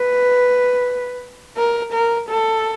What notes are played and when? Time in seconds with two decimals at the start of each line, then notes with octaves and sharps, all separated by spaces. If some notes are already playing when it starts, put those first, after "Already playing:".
Already playing: B4
1.57 A#4
1.93 A#4
2.29 A4